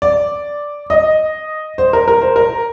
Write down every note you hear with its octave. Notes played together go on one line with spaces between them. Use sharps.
D5
D#5
C5
A#4
A#4
C5
A#4